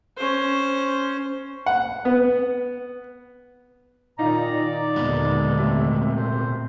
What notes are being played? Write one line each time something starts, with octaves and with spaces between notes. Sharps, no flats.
C#4 C5
F#5
B3
A#2 D#3 D#4 D5 F5 A#5
D#2 A#2 D3 G#3 B3 F#4
C3 A3
C5